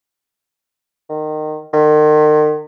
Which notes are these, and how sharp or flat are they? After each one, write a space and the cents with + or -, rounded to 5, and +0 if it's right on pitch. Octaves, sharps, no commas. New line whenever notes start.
D#3 -20
D#3 -40